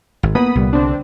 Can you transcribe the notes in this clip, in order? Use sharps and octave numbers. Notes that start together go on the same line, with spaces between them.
G#1
A#3 B3 B5 D#6
C2 A#2 G3
D3 C4 D4